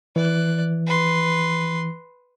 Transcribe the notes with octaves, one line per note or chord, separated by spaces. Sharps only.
E3 D5 F#6
B4 C6